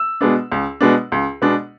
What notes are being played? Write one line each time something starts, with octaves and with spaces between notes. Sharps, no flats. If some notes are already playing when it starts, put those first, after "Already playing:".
Already playing: E6
B2 G#3 B3 D4
C#2
B2 G#3 B3 D4
C#2
B2 G#3 B3 D4